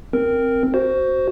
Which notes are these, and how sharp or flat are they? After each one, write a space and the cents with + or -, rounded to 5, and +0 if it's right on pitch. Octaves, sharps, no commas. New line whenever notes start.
C4 +0 A#4 +0
F#4 +15 C5 +0